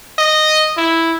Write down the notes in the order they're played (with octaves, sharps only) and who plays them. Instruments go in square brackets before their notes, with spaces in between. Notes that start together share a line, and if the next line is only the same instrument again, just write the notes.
[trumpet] D#5
E4